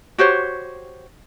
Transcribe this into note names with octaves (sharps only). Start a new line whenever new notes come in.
F#4 G4 C5 C#5